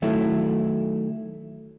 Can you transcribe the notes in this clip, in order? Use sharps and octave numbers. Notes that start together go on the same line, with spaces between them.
D#3 F#3 A3 E4